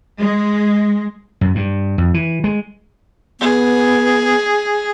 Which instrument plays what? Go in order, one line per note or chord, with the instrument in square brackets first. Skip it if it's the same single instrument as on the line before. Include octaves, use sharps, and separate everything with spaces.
[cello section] G#3
[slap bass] F#2
G2
F2
E3
G#3
[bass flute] B3 [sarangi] G#4